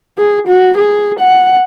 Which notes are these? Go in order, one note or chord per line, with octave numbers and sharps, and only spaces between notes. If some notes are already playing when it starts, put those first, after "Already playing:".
G#4
F#4
G#4
F#5